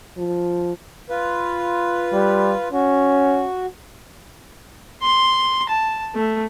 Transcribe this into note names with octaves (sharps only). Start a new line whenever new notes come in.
F3
F4 B4
G3
C#4 F#4
C6
A5
A3